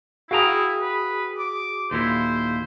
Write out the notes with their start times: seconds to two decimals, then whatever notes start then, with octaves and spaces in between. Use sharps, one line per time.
0.31 E4 F#4 G#4 F5 G5 A#5 D#6
0.81 B4
1.38 D6
1.91 D#2 A#2 E4 C5